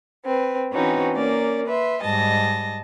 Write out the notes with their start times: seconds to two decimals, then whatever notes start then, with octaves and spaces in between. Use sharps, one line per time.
0.24 C4 B4
0.73 E3 C4 C#4 D#4 F#4 B4
1.14 A#3 C#4 A#4 D5
1.66 B4 E5 C6
2.02 G#2 G3 D#5 A5 A#6